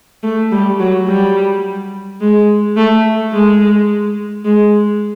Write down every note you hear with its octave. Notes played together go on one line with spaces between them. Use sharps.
A3
G3
F#3
G3
G#3
A3
G#3
G#3